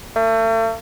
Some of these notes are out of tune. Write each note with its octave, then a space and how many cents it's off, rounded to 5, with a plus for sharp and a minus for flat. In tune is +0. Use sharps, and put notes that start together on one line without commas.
A3 +40